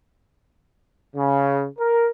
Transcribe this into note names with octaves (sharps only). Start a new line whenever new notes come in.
C#3
A#4